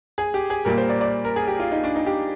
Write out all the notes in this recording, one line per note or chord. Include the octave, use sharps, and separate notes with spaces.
G#4
G4
G#4
A#2 G3 A#3 A#4
C5
D5
D5
A#4
G#4
G4
F4
D#4
D4
D#4
G4